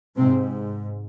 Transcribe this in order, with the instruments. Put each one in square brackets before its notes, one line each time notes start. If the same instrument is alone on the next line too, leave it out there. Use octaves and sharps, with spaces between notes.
[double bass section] G#2 C3 C4